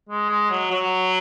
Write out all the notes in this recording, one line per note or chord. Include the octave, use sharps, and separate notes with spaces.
G#3
G#3
F#3
F#3